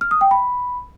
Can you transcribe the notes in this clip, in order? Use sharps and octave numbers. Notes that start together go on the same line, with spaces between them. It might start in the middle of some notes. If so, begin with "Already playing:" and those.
F6
D#6
G5
B5